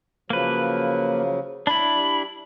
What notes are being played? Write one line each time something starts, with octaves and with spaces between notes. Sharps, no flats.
C#3 F3 F#3 A#3 B4
D4 E4 B5
G3